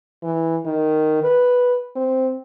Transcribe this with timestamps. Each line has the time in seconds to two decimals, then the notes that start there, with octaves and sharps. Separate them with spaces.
0.23 E3
0.66 D#3
1.23 B4
1.96 C4